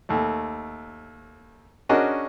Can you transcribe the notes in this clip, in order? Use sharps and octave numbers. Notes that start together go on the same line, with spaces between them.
D#2 A3
C#4 D4 F#4 G#4 A#4 D#5